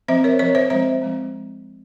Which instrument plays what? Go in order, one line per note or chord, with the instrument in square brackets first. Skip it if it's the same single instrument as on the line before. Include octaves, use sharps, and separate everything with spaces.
[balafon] F3 C4 C5 E5
A#4 C#5
F3 C4 A#4 C#5
C5 E5
F3 G#3 C4 C5 E5
F3 G#3 C4